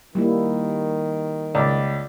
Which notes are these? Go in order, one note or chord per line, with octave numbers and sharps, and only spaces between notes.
D#3 G3 A#3 E4
C#2 D5